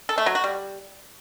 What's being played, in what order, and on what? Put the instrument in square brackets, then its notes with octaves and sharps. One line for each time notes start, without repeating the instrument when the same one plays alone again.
[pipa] A4
A3
F#3
F#4
G3